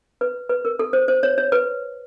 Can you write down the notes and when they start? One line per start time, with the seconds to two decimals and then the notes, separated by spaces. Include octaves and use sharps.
0.21 B4
0.50 B4
0.65 A#4
0.79 A4
0.93 C5
1.08 C5
1.23 C#5
1.38 C#5
1.52 B4